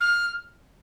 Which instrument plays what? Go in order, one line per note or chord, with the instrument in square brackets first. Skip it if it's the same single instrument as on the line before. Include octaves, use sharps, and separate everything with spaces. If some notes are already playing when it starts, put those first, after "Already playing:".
[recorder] F6